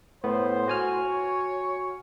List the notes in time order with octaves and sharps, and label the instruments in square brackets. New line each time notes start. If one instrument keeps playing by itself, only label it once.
[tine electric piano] A2 B3 [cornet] C5
[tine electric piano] F#4 G#5 F6
[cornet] C#5